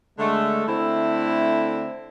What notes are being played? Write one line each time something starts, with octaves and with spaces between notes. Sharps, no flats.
D3 G#3 A3
D3 A3 C4 E4